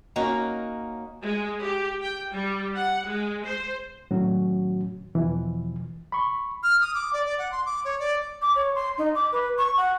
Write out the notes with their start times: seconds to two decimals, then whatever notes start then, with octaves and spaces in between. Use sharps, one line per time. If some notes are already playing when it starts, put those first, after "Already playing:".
0.16 A#3 C#4 D#4 F#4
1.23 G#3
1.63 G4
2.01 G5
2.32 G3
2.76 F#5
3.09 G#3
3.46 C5
4.11 A2 D#3 F#3 C#4 F#4
5.15 E2 B2 E3 F3
6.12 B5 C#6
6.63 F6
6.81 D#6
6.94 D6
7.13 D5
7.25 D5
7.39 F#5
7.52 C6
7.65 D6
7.85 C#5
7.99 D5
8.42 D6
8.55 C#5
8.75 C6
8.98 D#4
9.15 D6
9.32 B4
9.58 C#6
9.77 F#5